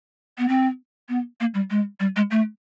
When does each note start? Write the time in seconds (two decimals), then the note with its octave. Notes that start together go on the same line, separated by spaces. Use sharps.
0.38 B3
0.48 C4
1.09 B3
1.40 A#3
1.54 G3
1.70 G#3
2.00 G3
2.16 G#3
2.31 A3